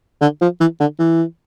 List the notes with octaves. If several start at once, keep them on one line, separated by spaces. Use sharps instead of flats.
D3
F3
E3
D3
E3